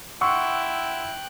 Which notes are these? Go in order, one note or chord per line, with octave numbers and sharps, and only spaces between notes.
E4 F#5 G5 C6 C#6 E6 F#6